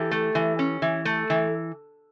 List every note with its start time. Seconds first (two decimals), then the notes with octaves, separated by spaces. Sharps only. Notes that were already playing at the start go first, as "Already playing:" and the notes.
Already playing: E3 G4 A4
0.11 A3
0.35 E3
0.59 C#4
0.82 E3
1.05 A3
1.30 E3